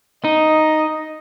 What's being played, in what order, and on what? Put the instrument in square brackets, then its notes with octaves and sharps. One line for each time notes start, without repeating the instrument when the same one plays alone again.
[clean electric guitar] D#4 [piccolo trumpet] D#5